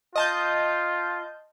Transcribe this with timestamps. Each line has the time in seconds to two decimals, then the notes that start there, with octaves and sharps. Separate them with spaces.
0.16 F4 D#5 A5 G6